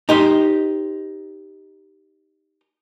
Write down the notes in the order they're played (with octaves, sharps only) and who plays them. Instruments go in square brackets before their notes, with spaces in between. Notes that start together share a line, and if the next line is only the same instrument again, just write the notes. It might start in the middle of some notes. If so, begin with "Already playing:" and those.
[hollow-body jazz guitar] D#4 G4 C5